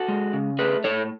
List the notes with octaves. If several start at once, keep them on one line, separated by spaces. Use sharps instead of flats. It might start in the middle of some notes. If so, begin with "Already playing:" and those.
Already playing: F#4 A4
G#3
C#3
A3 G#4 B4
A2 A4 C#5